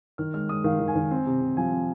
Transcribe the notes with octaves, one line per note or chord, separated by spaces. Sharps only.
D#3 F6
G#3 F6
G#3 D#6
D#3 F5
D#3
G#5
D#3
C4
C3
C3
F3 G#5
C4